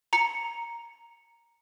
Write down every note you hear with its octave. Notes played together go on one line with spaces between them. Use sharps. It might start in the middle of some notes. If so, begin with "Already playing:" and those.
A#5 C#7